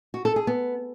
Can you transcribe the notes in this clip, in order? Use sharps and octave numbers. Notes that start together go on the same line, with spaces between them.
F#4
A4
G#4
B3